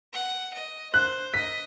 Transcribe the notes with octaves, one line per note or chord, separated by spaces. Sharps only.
F#5
D#5
C5 F#6
D#5 B6